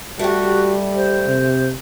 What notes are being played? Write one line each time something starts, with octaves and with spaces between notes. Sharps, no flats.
G3 A3 F#4 G4
C5
C3